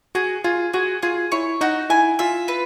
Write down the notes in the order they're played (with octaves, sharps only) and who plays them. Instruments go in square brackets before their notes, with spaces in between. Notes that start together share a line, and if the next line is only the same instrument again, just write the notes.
[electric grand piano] F#4 [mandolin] G#4
[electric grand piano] F4 [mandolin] G#4
[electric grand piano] F#4 [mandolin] G#4
[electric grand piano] F4 [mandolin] G#4
[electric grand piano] E4 [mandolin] C#5
[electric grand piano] D#4 [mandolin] F#4
[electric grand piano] E4 [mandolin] G#5
[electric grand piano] F4 [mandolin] E5
[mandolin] B4